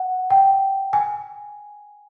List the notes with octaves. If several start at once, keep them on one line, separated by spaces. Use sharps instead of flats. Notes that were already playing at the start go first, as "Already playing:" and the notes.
Already playing: F#5
G5
G#5